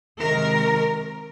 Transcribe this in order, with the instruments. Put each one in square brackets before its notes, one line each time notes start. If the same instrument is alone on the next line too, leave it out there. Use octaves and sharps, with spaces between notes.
[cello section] C3 D#3 G#3 A#4